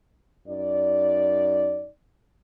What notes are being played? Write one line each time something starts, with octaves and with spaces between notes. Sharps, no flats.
F#2 D#4 D5